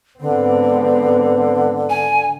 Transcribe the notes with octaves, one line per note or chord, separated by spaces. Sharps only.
G#2 D3 B3 C4
G#5